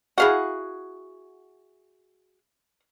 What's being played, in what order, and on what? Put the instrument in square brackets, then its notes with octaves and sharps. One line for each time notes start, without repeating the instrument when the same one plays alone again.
[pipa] E4 F5 F#5 [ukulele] F#4 G#4